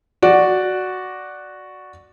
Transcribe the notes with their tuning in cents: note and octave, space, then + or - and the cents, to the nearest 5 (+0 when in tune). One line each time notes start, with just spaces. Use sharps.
F#4 +0 D5 +0